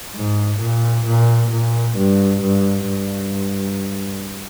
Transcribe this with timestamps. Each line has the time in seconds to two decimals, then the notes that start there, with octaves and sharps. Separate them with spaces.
0.16 G#2
0.60 A#2
1.06 A#2
1.51 A#2
1.97 G2
2.43 G2
2.88 G2